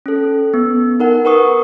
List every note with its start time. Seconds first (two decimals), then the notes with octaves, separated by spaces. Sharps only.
0.06 C#4 A4
0.54 B3
1.00 D#4 A#4 F#5
1.25 A#4 B4 F#5 C#6 D#6